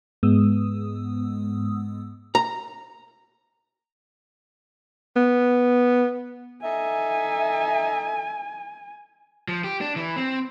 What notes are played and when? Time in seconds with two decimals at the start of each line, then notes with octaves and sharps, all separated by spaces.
0.23 G#2 G#3 B3 D#6 E6
2.35 A#5
5.16 B3
6.64 D#4 A4 E5 G#5
9.48 F3
9.64 G4
9.81 D4
9.96 E3
10.16 C4